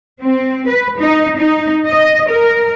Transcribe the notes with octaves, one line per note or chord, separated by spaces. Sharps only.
C4
B4
D#4
D#4
D#5
A#4